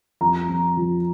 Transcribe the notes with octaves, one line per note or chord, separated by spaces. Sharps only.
F2 A#5
F2
F3